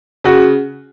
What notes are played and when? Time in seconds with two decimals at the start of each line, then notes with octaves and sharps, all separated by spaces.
0.24 C#3 F#4